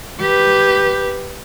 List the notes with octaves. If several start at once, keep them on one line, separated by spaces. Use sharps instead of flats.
G4 B4